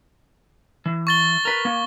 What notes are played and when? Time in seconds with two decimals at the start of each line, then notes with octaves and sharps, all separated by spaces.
0.86 E3
1.07 C#6 A6 G7
1.45 A#4 B4
1.65 A#3